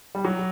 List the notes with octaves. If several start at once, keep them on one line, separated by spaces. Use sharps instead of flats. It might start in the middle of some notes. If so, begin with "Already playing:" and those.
G3
F#3